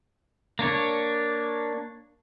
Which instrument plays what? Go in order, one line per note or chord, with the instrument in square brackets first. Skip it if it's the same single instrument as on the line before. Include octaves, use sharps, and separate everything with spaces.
[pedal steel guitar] A#3 D4 C#5